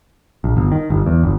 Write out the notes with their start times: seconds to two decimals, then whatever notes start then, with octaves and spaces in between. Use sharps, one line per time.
0.44 A#1
0.57 G1
0.72 D#3
0.90 G1
1.06 E2
1.23 G1